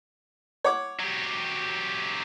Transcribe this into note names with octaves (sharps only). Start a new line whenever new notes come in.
C#5 F#5 D6
F#3 G4